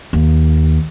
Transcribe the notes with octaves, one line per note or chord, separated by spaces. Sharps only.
D#2